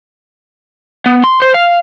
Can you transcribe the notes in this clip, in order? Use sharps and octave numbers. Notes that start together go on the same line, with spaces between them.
B3
C6
C5
F5